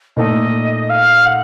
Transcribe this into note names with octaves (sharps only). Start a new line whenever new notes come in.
A#2 A3 D#4 A4 D#5
F5
F#5